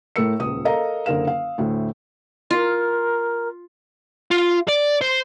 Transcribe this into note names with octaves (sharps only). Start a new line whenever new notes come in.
A2 A3 A#4 E6 C#7
D#1 C#2 D#6
A4 A#4 D#5 F5 A#5
F#1 D3 A#4 F5 E7
F5
D2 A2
F4 A#4
F4
D5
C5